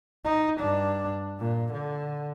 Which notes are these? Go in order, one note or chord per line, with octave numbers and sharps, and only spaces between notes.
D#4
G2 D4
A#2
D3